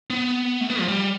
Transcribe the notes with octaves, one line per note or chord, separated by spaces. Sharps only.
B3
A3
B3
F3
G3